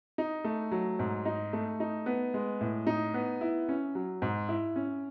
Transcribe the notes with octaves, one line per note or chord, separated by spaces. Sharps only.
D#4
A3
F#3
G#2
D#4
A3
D#4
B3
G#3
A2
D#4
B3
E4
C#4
F#3
G#2
E4
C#4